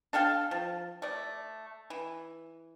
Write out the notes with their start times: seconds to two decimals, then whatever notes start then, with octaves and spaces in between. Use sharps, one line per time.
0.13 D4 A4 F5 G5
0.51 F3
1.02 A3 D5
1.90 E3